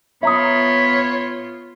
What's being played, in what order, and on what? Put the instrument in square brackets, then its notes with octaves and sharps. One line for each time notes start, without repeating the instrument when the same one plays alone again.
[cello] B3 F4 [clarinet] C#5 [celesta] E5 A#5 D#6 [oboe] B5